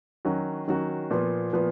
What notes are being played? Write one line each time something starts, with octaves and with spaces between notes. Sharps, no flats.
D#3 F#3 C#4 F#4
D#3 F#3 C#4 F#4
A#2 F3 B3
A#2 F3 B3